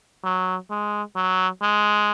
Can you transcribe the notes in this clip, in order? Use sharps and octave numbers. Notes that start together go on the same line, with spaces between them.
F#3
G#3
F#3
G#3